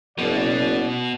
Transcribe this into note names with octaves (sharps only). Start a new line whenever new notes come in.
F#1 B2 B3 D5